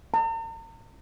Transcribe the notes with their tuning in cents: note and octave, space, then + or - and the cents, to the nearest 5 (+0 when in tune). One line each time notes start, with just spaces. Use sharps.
A#5 -45